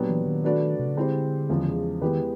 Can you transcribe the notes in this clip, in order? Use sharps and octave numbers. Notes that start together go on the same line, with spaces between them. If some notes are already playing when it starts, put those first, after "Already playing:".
Already playing: A#2 F#3 B3 D4 G4
E3
D#3
A3 D4 F#4 B4 D5
C3
C#3
D3 G#3 C4 E4 G4 C5
E2 C#3 F3 G#3
D#3 G#3 B3 E4 G4 B4